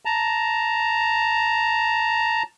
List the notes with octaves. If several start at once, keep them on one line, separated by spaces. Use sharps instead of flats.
A5 A#5